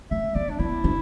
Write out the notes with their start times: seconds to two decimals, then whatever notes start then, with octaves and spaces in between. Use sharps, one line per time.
0.11 A3 E5
0.35 B3 D5
0.50 D4
0.59 B3 E4
0.84 D4